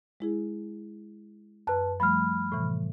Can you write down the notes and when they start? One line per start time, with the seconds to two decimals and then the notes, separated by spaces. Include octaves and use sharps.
0.20 G#3 E4 G#4
1.67 F#2 B4 A5 F#6
2.00 F3 G3 A3 B5 F6
2.52 A2 C3 E3